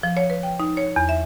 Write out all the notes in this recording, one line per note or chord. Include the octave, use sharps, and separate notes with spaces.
F3
C#5
B4
G5
D#4
C#5
E2
E5